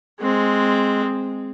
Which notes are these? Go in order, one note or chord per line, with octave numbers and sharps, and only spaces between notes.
G#3 C4